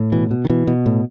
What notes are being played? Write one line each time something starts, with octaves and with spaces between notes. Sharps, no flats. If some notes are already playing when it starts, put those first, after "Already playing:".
Already playing: A2
B2 E3
B2
D#3
B2 E3
B2
A2